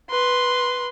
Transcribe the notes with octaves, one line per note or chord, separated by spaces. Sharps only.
B4 C6